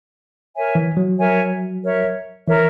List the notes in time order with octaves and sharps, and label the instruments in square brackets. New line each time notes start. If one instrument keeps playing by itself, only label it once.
[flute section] A#4 C#5 E5 G#5
[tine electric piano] E3
F#3
[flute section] A#4 C#5 E5 G#5
A#4 C#5 E5
[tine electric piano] E3 [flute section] A#4 C#5 E5